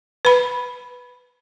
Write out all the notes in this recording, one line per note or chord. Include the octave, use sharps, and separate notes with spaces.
B4 B5